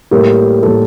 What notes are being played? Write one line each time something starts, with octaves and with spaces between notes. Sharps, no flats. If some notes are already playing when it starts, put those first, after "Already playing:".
A2 G3 A#3 G4 A#4
A2 G3 A#3 A4